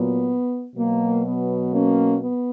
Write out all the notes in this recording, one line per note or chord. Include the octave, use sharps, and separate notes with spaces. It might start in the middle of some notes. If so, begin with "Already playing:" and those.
Already playing: A#2 F#3 B3
B2 F#3 A#3
B3
A#3 C#4
B3